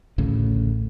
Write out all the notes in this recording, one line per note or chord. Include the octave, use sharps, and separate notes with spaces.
A1 D2 A2 C#3